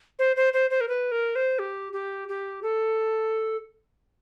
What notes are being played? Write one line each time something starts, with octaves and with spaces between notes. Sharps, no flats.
C5
C5
C5
C5
A#4
B4
A#4
C5
G4
G4
G4
A4